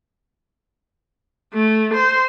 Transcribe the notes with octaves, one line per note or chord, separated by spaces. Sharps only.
A3
C5